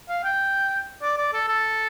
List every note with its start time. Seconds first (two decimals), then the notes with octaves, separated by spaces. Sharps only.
0.09 F5
0.24 G5
1.02 D5
1.18 D5
1.33 A4
1.48 A4